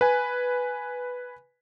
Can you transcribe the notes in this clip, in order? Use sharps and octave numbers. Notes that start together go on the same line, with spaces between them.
B4 G#5